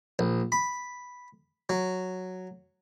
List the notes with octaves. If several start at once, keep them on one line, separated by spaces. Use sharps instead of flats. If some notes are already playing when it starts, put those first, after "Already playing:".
A#1
B5
F#3